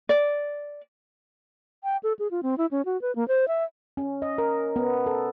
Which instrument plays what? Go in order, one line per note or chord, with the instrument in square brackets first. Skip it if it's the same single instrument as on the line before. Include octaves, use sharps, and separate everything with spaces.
[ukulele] D5
[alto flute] G5
A4
G#4
F4
C4
E4
C#4
F#4
B4
A#3
C5
E5
[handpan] C#4
D#5
A#4
B3
A4